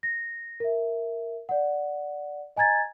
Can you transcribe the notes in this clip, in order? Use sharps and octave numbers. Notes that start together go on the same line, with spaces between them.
A#6
A#4 E5
D5 F#5
D#5 G#5 A#5 G#6 A6